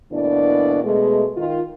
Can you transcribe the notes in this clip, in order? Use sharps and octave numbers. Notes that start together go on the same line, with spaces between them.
D2 B2 E3 A#3 D4 D5
B2 G#3 A3
D#3 F4